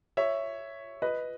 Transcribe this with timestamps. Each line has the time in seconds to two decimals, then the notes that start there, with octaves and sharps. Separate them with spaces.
0.17 C#5 E5
1.02 B4 D#5